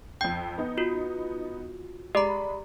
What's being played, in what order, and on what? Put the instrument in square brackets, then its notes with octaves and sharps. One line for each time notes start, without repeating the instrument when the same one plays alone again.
[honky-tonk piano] F2 G6 [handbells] G5
[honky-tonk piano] B3 D#4
[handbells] F4 F#4
[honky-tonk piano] G#3 B5 [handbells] G4 A#5 [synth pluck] D5